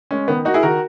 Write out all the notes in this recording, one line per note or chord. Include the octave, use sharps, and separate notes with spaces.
G#3 C#4
D#3 B3
A#3 D#4 F#4
E4 G#4
D#3 F#4 A#4